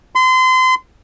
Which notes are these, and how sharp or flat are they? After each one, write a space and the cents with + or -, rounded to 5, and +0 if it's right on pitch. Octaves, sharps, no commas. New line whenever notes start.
C6 -30